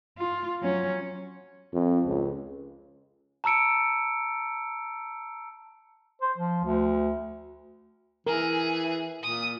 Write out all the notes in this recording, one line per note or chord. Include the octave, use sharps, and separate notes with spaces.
F4
F#3 C#4
F2
C#2
A5 A#5 E6 C#7 D7
C5
F3
D2
E3 G#4 A#4
A#2 D#6